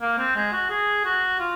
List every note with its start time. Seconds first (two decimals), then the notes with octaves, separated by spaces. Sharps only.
0.01 A#3
0.18 C4
0.36 G#3
0.52 F#4
0.70 G#4
1.05 F#4
1.40 F4